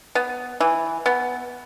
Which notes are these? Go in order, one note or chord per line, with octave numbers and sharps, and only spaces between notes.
B3
E3
B3